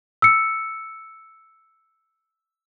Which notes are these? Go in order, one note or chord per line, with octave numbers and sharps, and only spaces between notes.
E6 C#7